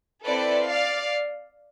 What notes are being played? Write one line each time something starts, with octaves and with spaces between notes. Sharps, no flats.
C4 E4 A4 B4 D5
D5 F5